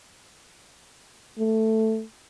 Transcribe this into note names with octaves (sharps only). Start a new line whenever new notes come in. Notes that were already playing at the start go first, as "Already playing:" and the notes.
A3